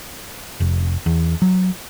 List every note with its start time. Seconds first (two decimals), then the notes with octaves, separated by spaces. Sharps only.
0.60 F1
1.06 E2
1.42 F#3